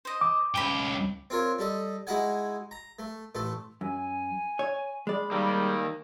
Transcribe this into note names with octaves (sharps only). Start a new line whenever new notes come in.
C5 D#5
D6
C#2 G4 G5 B5
C4 F4 A#4 C#5
G3 A4 D#5
G#3 D#4 E4 F#4 F#5 G#5
A#5
A3
A1 A3 A4
F#2 G#5
C#5
G#3 D5 B5
D#3 G3 A#3